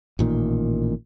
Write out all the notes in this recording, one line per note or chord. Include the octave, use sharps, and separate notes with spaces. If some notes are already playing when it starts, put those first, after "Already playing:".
A1 A#2 D#3